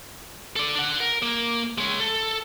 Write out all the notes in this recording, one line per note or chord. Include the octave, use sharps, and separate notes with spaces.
A4 D5
D4 F#5
A#4
A#3
G#3 C#5
A4